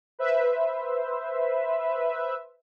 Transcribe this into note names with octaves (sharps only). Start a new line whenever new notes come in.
B4 C5 E5